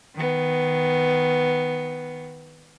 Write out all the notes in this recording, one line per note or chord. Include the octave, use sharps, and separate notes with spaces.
D#3 B3